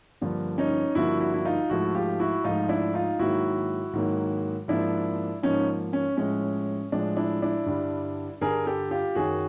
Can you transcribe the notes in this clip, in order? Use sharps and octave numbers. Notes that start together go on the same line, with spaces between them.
G2 D3 F3 A#3
C#4 D#4
G2 D3 F3 A#3 E4 F#4
E4 F#4
E4
D#4 F4
G#2 F3 A3 E4 F#4
F4 G4
E4 F#4
G#2 F3 A3 D#4 F4
D4 E4
D#4 F4
G#2 D#3 F#3 A#3 E4 F#4
G#2 D#3 F#3 A#3
G#2 F3 A#3 D4 E4
G#2 F3 A#3 C#4 D#4
C#4
A2 F3 G#3 C#4
A2 F3 G#3 D4
D4 E4
D4 E4
G2 D3 G3
G2 D3 G3 G#4 A#4
G4 A4
F4 G4
F#2 D#3 F#3 F#4 G#4